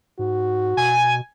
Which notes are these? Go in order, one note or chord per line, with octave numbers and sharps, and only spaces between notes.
G#2 F#4
B2 G#5